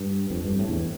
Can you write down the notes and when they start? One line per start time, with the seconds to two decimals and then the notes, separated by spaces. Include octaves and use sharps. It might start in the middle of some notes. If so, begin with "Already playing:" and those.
Already playing: G2
0.30 F2
0.45 G2
0.59 A2
0.69 E2